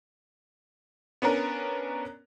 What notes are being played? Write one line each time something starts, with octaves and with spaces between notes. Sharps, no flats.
B3 C#4 D4 A#4